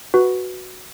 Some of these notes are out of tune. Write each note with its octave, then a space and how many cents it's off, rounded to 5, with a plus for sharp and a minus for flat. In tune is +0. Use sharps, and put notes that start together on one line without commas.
F#4 +0 B4 +0